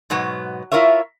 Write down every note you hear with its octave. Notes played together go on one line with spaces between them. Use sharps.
G#2 B2 F#3 B3
E4 F4 A#4 C#5 E5